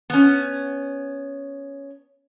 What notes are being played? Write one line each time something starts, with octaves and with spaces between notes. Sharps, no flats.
B3 C#4